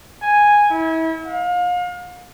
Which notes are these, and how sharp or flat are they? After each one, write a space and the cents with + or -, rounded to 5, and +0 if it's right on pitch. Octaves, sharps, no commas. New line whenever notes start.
G#5 -5
E4 -30
F5 +35